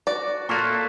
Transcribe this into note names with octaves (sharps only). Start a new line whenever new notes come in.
F#4 D5
A#2 A#3 F4 A4 E5 C#6 F#6 A6